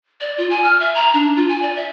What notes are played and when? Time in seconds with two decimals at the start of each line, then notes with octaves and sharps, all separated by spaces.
0.21 D5
0.38 F4
0.50 G#5
0.64 F6
0.80 E5
0.95 A#5
1.14 D4
1.37 F4
1.49 G#5
1.62 D5
1.76 E5